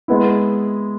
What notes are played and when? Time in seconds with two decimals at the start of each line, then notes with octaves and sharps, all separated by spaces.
0.08 G#3 B3 E4